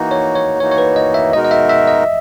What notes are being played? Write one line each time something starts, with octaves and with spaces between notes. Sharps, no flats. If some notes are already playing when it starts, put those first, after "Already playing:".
Already playing: E3 A#3 D#4 F#4
C#5
C#5
E3 A#3 D#4 F#4 C#5
C#5
B4
D#5
E5
B2 G#3 D#4 F#4 A#4 D#5
D#5
E5
E5
D#5